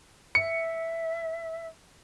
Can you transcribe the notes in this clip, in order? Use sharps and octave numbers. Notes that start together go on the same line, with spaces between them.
E5 C#7